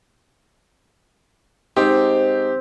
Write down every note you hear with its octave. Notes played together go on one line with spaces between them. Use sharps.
G#2 C4 D#4 G4 G5